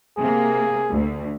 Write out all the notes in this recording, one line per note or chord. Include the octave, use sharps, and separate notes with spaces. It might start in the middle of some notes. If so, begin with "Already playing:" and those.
C3 A#3 G#4
D2